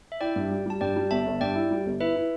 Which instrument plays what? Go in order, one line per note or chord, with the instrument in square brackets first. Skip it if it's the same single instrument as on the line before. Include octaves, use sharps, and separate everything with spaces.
[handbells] E5
[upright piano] E4 [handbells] D5 G5
[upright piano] G2
G3
[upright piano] G3 [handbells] A5
[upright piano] G2 [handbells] D5 G5
[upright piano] G3
[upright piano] G1 [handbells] E5 A5
[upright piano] G1
[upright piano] G2 [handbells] D5 G5
[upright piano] E4
G3
G1
[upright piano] E4 [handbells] B4 E5
[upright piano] E4